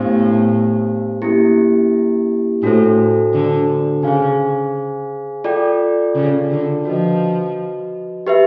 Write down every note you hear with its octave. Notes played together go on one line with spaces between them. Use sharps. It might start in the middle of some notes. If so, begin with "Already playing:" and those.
Already playing: A2 B3 D4 G4 C5 F5
A#3 C#4 E4 G4
A2 D4 F#4 A4 C5
D3
C#3 G#4 C5 F5 G#5
F4 A4 D5 G5
C#3
D3
F3 F#4 B4 D#5
G4 B4 E5